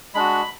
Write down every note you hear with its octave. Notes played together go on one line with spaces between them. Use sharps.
G#3 D4 F#4 B5